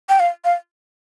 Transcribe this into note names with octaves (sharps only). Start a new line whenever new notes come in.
G5
F5
F5